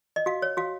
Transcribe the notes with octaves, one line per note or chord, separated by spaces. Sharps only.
D#5
F#4 F5
C#5
F#4 F5